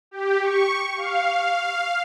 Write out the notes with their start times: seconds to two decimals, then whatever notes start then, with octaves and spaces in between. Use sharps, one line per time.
0.11 G4
0.42 C#6
0.97 F5